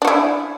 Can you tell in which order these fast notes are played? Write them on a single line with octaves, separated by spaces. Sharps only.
D4 F#4 E4